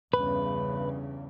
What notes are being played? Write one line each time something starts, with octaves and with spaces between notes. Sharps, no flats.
E2 G2 C#3 B4